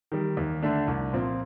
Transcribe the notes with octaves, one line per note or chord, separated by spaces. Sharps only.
D#3 G3
D#2
D3 A3 D4
C2
A#2 F3 C4